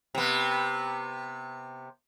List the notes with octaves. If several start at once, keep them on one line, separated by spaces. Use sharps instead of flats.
C3 B3